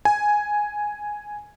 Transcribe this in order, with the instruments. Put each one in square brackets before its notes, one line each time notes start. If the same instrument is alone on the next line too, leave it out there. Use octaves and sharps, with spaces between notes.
[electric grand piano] G#5